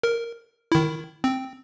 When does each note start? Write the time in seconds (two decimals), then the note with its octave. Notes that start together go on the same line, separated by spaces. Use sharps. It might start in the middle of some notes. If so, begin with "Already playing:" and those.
0.03 A#4
0.72 D#3 E4
1.24 C4